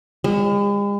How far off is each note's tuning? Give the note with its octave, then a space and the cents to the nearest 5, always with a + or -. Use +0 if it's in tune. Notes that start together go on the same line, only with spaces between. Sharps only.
G#3 -45